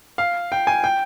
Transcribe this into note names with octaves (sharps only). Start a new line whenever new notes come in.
F5
G5
G#5
G5